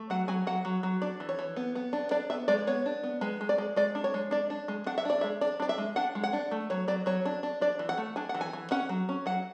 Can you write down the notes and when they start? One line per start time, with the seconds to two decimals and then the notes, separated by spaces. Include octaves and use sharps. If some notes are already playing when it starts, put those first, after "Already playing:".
Already playing: A3
0.10 F#3 F#5
0.28 F#3 G#5
0.47 F#3 F#5
0.65 F#3
0.83 F#3
1.02 D4 D5
1.20 E3
1.29 C#5
1.39 E3
1.56 B3
1.75 B3
1.93 D4
2.11 D4 D5
2.30 B3 E5
2.48 G#3 D5
2.67 B3 C#5
2.86 D4
3.03 B3
3.21 G#3 B4
3.41 G#3
3.49 D5
3.58 G#3
3.76 G#3 D5
3.95 D4
4.04 C#5
4.14 G#3
4.31 D4 D5
4.50 D4
4.68 G#3
4.86 D4 F#5
4.98 E5
5.05 D4 D5
5.21 G#3 E5
5.41 D4 D5
5.60 D4 D5
5.69 E5
5.78 G#3
5.96 D4 F#5
6.15 G#3
6.24 F#5
6.33 D4
6.51 A3
6.70 F#3 C#5
6.88 F#3 D5
7.06 F#3 C#5
7.25 D4
7.43 D4
7.61 D4 D5
7.79 E3
7.89 F#5
7.98 A3
8.16 D4 G#5
8.29 F#5
8.35 E3
8.41 G#5
8.53 E3
8.71 C#4 F#5
8.89 F#3
9.09 C#4
9.26 F#3 F#5